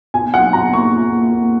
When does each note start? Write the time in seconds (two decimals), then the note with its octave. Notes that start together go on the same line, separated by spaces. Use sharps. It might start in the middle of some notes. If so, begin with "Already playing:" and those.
0.14 B2 G#5
0.34 F#3 F#5
0.53 B2 A#5
0.73 A#3 C#6
0.93 F4
1.12 A#3
1.32 A#3